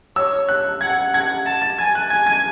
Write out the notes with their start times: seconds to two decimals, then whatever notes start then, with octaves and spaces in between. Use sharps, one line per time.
0.16 C#5 E6
0.49 F#6
0.81 F#5 G#6
1.14 F#5 G#6
1.46 A5 A6
1.62 A6
1.79 G#5 G#6
1.95 F#6
2.10 G#5 G#6
2.27 G#6